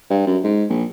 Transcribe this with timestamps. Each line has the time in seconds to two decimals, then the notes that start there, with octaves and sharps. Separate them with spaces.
0.10 G2
0.27 F#2
0.44 G#2
0.69 A#1